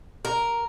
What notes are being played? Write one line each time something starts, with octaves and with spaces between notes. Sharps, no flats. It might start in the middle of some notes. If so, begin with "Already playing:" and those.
A#4